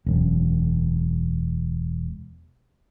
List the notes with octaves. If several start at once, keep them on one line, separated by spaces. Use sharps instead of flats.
E1 F#2